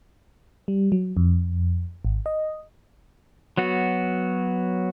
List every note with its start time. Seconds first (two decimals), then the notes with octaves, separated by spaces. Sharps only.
0.68 G3
0.92 F#3
1.17 F2
2.05 G#1
2.26 D#5
3.57 F#3 B3 F#4